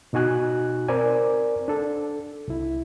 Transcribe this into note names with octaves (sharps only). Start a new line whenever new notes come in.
B2 D#4 F#4 G#5 F#6
C4 A#4 C5 D5 G#5
D4 A4
C2 E4